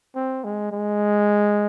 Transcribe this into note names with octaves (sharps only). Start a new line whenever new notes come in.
C4
G#3
G#3